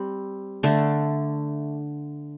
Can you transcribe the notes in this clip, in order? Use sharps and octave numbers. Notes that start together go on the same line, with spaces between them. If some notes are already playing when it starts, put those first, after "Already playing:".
Already playing: G3 C4
D3 A3 D4 A4